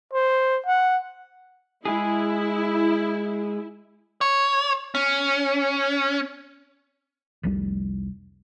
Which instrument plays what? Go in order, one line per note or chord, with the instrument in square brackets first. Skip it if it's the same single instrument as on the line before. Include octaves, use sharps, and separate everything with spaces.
[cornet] C5
F#5
[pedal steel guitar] G#3 G#4 [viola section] E4
[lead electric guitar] C#5
C#4
[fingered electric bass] F1 C2 G3